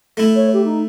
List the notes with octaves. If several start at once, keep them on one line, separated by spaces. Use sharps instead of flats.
A3 E4
C#5
G4
D#4